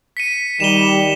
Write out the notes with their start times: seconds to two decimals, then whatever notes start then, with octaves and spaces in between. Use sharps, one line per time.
0.17 B6 C#7 D#7
0.60 D#3 G3 E7 F7 G7